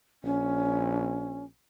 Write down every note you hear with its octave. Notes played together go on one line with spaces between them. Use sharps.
A#1 C#4